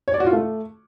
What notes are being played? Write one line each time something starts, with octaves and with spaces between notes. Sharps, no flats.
C#5
D5
F#4
F4
A3